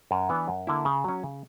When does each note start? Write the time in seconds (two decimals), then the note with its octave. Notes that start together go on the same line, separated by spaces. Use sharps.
0.11 F#2
0.29 E3 B3 D4
0.48 F#2
0.67 D3 A#3 E4
0.85 C#3
1.04 F#3 C#4
1.24 C#3